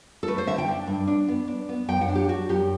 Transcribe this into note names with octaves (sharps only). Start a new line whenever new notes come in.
A4
A3 B4
C5
D3 E5
G5
D4
G2
D4
B3
D4
B3
F#2 G5
F#5
D4
G4
D4 F#4
F#2 G4